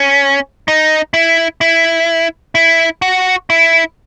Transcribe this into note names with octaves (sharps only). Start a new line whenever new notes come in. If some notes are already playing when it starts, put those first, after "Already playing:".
Already playing: C#4
D#4
E4
E4
E4
F#4
E4